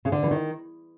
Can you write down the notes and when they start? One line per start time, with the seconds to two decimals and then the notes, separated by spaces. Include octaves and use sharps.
0.05 C#3
0.12 D3
0.23 E3
0.31 D#3